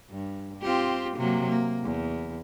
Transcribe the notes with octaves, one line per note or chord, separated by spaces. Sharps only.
G2
C4 F4 G4
C3 F#3 A#3
A#3
E2